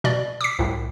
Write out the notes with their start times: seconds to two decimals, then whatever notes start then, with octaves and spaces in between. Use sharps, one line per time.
0.04 B2 D5
0.41 D6 B6
0.59 C2 A2